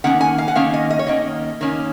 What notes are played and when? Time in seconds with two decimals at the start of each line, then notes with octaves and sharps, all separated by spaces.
0.04 D#3 A#3 C#4 F#5
0.21 G#5
0.38 F5
0.48 F#5
0.55 D#3 A#3 C#4 F5
0.74 D#5
0.90 D#5
0.99 C#5
1.07 D#3 A#3 C#4 D#5
1.61 D#3 A#3 C#4